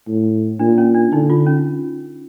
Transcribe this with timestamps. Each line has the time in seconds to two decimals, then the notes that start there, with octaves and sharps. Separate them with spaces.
0.08 A2
0.59 A#2 D4
0.78 C#4
0.94 D4
1.13 D3 D#4
1.30 F4
1.46 C#4